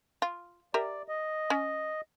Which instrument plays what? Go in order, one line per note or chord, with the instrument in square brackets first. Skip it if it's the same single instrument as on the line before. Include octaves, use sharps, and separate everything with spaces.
[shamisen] F4
[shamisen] G4 A#4 E5 [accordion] D5
[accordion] D#5
[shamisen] C#4